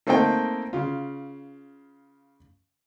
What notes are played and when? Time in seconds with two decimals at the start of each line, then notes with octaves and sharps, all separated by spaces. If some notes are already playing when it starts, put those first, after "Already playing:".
0.07 A3 A#3 C4 D#4 A4 G5
0.73 C#3 F4